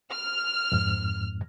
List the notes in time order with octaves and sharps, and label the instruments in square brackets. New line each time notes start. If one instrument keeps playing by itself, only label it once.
[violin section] F6
[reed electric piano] F2 G#2